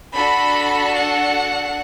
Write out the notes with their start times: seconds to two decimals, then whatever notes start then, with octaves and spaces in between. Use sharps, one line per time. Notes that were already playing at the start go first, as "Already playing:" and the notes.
0.14 D4 F#4 A4 B5
0.93 F#5